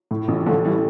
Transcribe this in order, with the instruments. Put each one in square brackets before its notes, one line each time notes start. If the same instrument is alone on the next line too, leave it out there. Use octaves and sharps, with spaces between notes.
[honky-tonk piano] A2
A1
[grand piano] D3 F3 [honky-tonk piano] A3
[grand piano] E3 G3